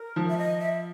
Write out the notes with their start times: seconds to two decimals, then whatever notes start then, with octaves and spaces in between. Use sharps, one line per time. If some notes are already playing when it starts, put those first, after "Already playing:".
Already playing: A#4
0.16 F3
0.28 E5
0.38 D#5
0.59 E5